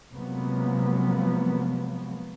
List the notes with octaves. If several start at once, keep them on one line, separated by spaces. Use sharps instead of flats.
C3 F3 F#3 G#3 A#3 B3